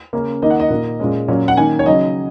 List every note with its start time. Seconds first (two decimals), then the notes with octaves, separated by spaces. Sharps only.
0.13 C#3 A#3 C#4
0.42 D#3 A#3 D#4 D#5
0.50 F#5
0.60 D#5
0.70 A#2 A#3 D#4
1.00 A#2 G#3 C#4
1.28 A#2 F#3 C#4
1.48 F#5
1.57 D#3 A#3 C#4 G#5
1.79 C#5
1.86 C#3 F#3 D#4 D#5